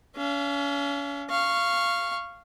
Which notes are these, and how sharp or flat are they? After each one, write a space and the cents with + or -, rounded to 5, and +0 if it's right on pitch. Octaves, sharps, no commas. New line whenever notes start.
C#4 +40 F5 -35
F5 -10 C#6 -10